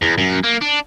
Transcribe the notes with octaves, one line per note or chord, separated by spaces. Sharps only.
E2
F#2
A#3
D4